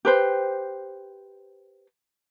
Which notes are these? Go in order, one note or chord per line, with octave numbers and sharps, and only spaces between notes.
G4 B4 C5